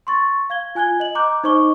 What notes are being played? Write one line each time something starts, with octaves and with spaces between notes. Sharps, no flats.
C6 C#6 A6
F5 G#6 G7
F4 G#5 F#6 G#6 G7
D#5 F#7
A#5 C6 D6 F#6 G6
D#4 C5 D#5 C#6 D6 G7